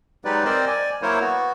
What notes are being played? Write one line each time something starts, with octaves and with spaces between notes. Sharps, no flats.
F#3 G#3 D#4 G4 B4 D5
C4 A#4 C5 D5 D#5
D5 G#5
F#3 A#3 E4 A#4 C5 C#5
B3 F#4